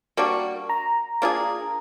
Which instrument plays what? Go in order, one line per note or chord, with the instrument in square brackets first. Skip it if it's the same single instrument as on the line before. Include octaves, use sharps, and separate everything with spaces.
[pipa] G3 A#3 D4 F#4
[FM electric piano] A#5
[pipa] A#3 D4 F4 G#4